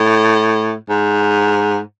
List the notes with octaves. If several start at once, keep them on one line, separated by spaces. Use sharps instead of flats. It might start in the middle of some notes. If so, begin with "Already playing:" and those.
Already playing: A2
G#2